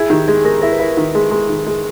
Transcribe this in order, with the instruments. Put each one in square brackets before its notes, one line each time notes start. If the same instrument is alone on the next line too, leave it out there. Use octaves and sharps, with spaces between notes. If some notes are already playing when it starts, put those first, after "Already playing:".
Already playing: [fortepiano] E4 [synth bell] G#4
[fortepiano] D#3 [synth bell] G4
[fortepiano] G#3 [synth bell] G#4
[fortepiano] G#3 [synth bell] A#4
[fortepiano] E4 [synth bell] A#4
[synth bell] B4
[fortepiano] E4 [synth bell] A#4
[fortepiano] D#3
G#3
G#3
D#3
G#3